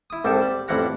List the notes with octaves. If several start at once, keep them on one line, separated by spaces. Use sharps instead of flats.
E4 D#6
C2 G#2 G4 A4 E5
G3
A1 F2 G3 E4 F#5 A#5